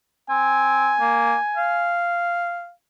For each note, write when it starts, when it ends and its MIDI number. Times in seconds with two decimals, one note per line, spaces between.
0.30 0.94 60
0.30 2.03 80
1.00 1.35 58
1.57 2.71 77